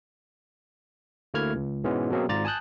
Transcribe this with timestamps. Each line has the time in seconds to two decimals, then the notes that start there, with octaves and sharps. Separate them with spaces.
1.34 D2 A3 A#3 E4 F6 G#6
1.55 C#2
1.84 G#2 B2 E3 G#3 B3 C#4
2.11 B2 F#3 A#3 C4 C#4 G#4
2.29 G#1 G#2 F4 D5 A#5 A6
2.45 G#5 A5 D#6 F#6 G6